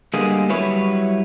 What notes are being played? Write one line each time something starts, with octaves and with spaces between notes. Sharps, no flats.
D3 G3 G#3 A#3 B3 G#4
F#3 G3 E4 B4 C#5